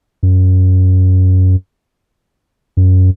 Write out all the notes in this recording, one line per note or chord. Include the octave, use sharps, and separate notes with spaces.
F#2
F#2